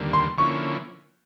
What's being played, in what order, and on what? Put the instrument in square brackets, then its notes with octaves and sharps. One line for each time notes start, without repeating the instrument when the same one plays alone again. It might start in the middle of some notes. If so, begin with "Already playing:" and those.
Already playing: [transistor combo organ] D#2 D3 G3 A#3
[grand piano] C6
[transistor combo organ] D3 F3 A#3 C#4 E4 [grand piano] C#6